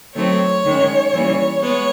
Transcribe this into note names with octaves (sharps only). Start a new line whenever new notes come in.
D#3 F#3 A3 C4 C#5
D#3 G#3 C#4
E3 G3 A#3 C#4
G#3 B3 C#5